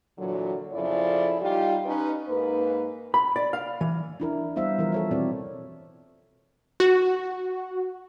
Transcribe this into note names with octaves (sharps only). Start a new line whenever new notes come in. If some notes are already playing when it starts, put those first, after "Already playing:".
A#2 D3 E3 F#3
F2 C#3 F3 E4 A4 D5
G3 D#4 F4 G4
C#4 D#4 B4
G#2 A#3 D#4 B4
B5
D5
F5
E3
D4 E4 A#4
G3 B3 E4 C5 E5 F5
E3 F3 A#4
A4 C#5 E5
B2 C4 C#5 D5
F#4